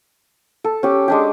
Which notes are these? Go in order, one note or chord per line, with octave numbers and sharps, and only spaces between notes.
A4
C#4 G4
G#3 D4 G4